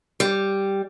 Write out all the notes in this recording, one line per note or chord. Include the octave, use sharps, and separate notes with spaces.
G3